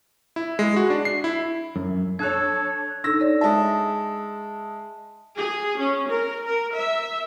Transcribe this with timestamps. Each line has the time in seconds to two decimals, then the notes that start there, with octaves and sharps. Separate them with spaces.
0.36 E4
0.59 G#3
0.76 F#4
0.90 D4
1.05 C7
1.24 E4
1.76 F#2
2.19 D4 A4 C#5 F#6 G#6
3.04 D4 D#4 A4 E6 A#6
3.20 D#4 C#5 D5
3.41 G#3 E5 A5 D#6
5.37 G#4
5.78 C#4
6.09 A#4
6.46 A#4
6.78 E5